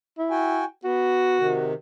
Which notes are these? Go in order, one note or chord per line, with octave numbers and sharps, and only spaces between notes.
E4
F#4 G5 G#5
B3 F#4
C3 D#3